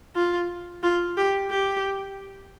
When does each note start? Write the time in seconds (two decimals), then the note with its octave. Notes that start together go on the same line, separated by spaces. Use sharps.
0.15 F4
0.83 F4
1.17 G4
1.50 G4